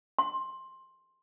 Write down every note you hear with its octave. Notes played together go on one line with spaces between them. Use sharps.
C6